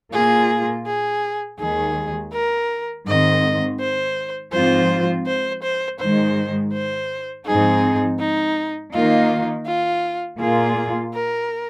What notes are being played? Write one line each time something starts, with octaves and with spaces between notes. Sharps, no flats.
A#2 A#3 F4 G#4
G#4
D#2 D#3 G#3 G#4
A#4
G#2 D#3 C4 D#5
C5
G#2 F3 C4 F4 C5
C5
C5
G#2 D#3 G#3 C5
C5
G#2 F3 C4 D#4 G#4
D#4
D#3 A#3 D#4 F4
F4
A#2 A#3 F4 G#4
A#4